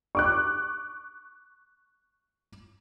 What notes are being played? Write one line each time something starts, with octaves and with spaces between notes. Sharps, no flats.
C#6 D6 F#6